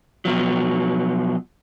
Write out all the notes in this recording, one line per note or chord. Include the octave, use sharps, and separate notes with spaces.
B2 F3 F#3